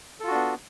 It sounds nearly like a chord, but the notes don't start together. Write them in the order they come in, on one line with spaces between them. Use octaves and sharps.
A4 F4 F#4 D4 B3